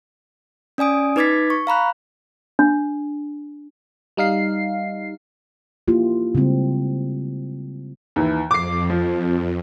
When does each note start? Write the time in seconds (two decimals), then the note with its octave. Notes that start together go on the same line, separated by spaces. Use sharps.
0.78 C#4 D5 G#5 D#6 D7
1.16 D#4 B4 D6 G#6 A6 B6
1.50 C#6
1.67 F5 A#5 B5 F#6
2.59 D4
4.17 G3 D#4 F5 C7
5.88 A#3 E4 F4 G4
6.35 C#3 G3 G#3 C4
8.16 D#2 E3
8.51 F2 D6 C7
8.90 F3